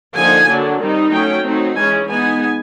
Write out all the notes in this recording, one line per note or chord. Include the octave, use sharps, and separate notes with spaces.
D3 F3 A#3 D#4 G#5
D3 F#3 A#3 D4
D#3 G3 C4 D#4
F#3 A3 C#4 G5
F#3 A3 C4 D#4
E3 G#3 C#4 G#5
G#3 B3 D#4 G#5